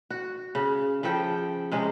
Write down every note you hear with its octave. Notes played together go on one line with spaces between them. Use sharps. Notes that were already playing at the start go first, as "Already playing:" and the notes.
F#4
C#3
C#3 F3 A4 G5
C3 G#3 C#4